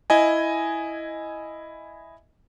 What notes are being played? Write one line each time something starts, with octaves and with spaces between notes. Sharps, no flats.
E4 D#5 G#5